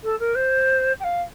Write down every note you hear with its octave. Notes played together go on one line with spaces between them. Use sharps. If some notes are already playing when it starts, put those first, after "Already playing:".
A4
A#4
C5
G5
F5